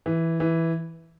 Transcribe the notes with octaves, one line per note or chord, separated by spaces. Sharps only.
E3
E3